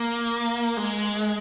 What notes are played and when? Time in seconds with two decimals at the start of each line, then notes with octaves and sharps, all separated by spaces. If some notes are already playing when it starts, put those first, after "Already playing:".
Already playing: A#3
0.77 G#3